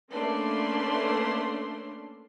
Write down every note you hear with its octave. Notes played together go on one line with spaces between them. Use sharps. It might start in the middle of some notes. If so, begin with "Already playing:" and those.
A3 A#3 C#4 D4 B4 C6